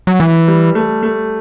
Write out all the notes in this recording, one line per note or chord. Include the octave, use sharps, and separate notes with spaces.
F#3
E3
G3
A3
A3